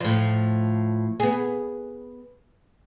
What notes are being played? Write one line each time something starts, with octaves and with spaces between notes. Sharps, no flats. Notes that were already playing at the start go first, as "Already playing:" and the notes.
A2 F3
B3 G#4